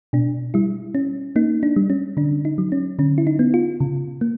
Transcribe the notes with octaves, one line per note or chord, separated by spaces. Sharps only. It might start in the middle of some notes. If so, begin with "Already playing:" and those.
B2 D4
G3 E4
C#4
A#3 D#4
D4
G3
C#4
D3 D4
D#4
F#3
C#4
D3 C#4
E4
D#4
B3
F4
C#3
A#3